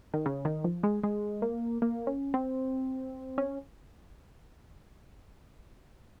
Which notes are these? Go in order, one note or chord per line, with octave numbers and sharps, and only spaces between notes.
D#3
C#3
D#3
F3
G#3
G#3
A#3
A#3
C#4
C4
C#4